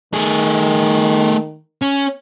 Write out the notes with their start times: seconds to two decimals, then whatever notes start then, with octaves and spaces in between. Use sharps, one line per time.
0.14 D#3 A3 G#4
1.82 C#4